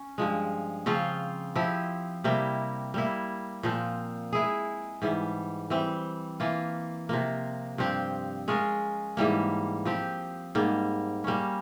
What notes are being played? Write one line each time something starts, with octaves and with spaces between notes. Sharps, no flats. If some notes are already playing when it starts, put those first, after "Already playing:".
Already playing: C#4
G2 F3 G#3
C#3 F3 C4 F4
F3 C4 E4 G4
C3 G3 A#3 E4
G3 A#3 E4
A#2 F3 C4
G#3 E4 G#4
G#2 E3 G3
E3 G3 C4
E3 A#3 F4
C3 F3 A#3
G2 F3 C4 G4
G#3 C#4 F4 A#4
G#2 E3 G3 A#3
F3 C4 G4
G#2 G3 A#3
G3 A#3 C#4